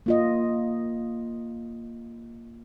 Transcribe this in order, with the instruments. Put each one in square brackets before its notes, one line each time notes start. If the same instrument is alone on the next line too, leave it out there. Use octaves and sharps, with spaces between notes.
[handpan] A#3 F4 D#5